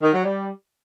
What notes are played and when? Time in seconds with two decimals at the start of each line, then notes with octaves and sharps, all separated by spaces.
0.02 D#3
0.13 F#3
0.24 G3